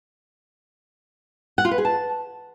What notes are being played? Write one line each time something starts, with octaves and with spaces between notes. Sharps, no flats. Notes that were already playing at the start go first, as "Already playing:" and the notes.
F#5
F4
B4
G#4
A5